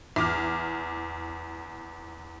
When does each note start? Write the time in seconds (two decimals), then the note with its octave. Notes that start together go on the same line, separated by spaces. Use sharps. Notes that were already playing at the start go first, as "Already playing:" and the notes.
0.16 E2 D6 F6